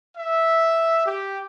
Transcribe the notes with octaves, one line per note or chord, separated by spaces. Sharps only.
E5
G4